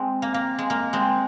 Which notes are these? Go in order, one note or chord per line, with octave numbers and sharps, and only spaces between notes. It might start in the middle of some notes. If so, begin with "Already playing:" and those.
Already playing: G#3 C4
A#3
A#3
G#3
A#3
G#3 C4